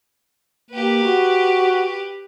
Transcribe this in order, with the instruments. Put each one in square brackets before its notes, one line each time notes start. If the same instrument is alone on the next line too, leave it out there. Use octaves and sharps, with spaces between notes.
[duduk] A#3 [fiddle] G4 B4
[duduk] F#4